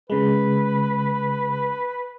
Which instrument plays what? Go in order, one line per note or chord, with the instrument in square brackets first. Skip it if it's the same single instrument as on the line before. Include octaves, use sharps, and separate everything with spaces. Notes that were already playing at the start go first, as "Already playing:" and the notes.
[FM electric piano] C#3 G#3 [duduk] B4